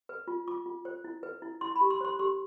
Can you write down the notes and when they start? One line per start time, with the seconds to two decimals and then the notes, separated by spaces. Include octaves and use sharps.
0.09 B4
0.28 F4
0.48 F4 D6
0.66 F4
0.85 C5
1.04 E4
1.23 B4
1.42 E4
1.61 E4 C6
1.76 B5
1.81 G4
1.90 C6
2.01 C5 C6
2.19 G4 C6